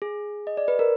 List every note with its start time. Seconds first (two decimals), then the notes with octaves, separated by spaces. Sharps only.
0.02 G#4
0.47 D#5
0.57 D5
0.68 B4
0.79 A#4